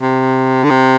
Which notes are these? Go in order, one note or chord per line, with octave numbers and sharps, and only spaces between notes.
C3
D3
C3